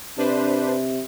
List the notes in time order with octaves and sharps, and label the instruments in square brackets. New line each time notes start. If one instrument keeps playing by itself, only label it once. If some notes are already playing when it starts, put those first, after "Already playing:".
[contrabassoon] C3 [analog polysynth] D4 B4 C5